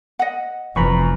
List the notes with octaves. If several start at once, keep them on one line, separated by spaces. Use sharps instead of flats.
D#5 F#5
F1 E2 A#5 B5 C#6